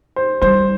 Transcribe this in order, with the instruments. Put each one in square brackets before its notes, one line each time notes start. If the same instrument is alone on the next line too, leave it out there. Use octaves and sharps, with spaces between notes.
[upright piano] C5
[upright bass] G3 [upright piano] C5